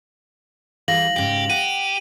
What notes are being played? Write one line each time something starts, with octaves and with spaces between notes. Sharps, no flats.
E3 G3 G#4 F5 A#6 F#7
G#2 C#3 G4
G4 F#5 D#7